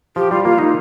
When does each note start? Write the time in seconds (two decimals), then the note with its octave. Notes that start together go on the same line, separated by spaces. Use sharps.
0.16 F3 G4
0.31 G3 F4
0.44 A#3 F4
0.58 A#3 D#4